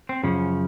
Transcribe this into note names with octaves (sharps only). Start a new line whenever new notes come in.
C4
F#2 C#3 F3 C#4